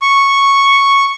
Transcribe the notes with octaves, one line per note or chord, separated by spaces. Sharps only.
C#6